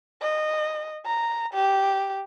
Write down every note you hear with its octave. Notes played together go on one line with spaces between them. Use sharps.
D#5
A#5
G4